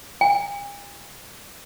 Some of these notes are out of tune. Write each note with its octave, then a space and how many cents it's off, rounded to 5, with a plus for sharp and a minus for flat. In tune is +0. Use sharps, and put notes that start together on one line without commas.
G#5 -45